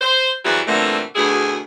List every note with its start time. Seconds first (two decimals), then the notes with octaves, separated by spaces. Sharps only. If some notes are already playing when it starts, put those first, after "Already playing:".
0.02 C5
0.44 E2 F#3 G3 C4 E4 F#4
0.67 A#2 D3 E3 G3 A3 C4
1.15 D2 B2 B3 E4 G#4